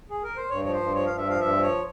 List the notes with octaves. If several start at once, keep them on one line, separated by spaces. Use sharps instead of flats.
G#4
A#4
C5
G2 C#5
F3 C#5
C5
G2
F3 C#5
G2 F5
E5
F3 F5
G2 E5
F3
C#5